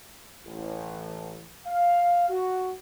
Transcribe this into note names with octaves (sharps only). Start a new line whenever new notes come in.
A1
F5
F#4